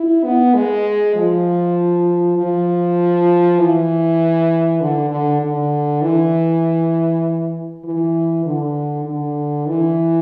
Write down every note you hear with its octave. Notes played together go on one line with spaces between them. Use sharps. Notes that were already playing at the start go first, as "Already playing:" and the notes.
Already playing: E4
B3
G#3
F3
F3
E3
D3
D3
D3
E3
E3
D3
D3
E3